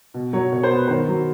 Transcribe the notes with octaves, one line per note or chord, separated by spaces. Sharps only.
B2
F#3 C#5
B2 C#5
C5
B3
B4
D#3 C5
F#3